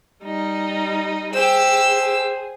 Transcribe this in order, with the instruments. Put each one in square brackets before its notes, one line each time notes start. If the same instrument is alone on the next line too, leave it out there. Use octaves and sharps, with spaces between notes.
[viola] G3 D#4
[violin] G4 E6 [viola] G#4 [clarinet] C5